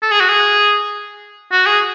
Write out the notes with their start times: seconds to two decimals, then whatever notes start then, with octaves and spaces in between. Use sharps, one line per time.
0.02 A4
0.11 G#4
0.20 F#4
0.29 G#4
1.52 F#4
1.66 G#4